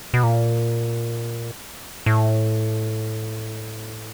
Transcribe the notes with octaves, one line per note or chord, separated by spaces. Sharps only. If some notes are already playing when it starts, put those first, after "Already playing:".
B2
A#2
A2